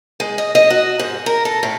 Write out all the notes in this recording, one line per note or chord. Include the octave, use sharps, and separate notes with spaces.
G#3
D#5
D#5
F#4
G#2
A#4
A4
A2